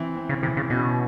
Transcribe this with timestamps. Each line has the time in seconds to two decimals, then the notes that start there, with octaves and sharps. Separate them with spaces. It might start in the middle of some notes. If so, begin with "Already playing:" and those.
Already playing: E3 C4
0.16 C4
0.29 C#3
0.43 C3 E3
0.57 C#3
0.70 B2 C#4